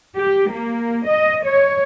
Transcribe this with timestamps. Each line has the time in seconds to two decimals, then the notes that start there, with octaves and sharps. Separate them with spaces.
0.16 G4
0.51 A#3
1.07 D#5
1.46 C#5